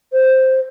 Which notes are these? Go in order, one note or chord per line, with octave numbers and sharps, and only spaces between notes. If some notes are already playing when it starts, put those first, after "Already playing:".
C5